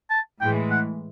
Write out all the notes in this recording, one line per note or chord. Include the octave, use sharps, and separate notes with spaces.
A5
A2 E3 G#3 G5
F#5